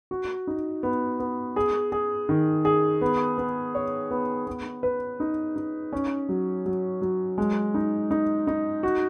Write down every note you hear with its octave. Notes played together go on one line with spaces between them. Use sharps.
F#4
D#4
B3
B3
G#4
G#4
D#3
G#4
B3
B3
C#5
B3
B3
B4
D#4
D#4
C#4
F#3
F#3
F#3
G#3
D#4
D#4
D#4
F#4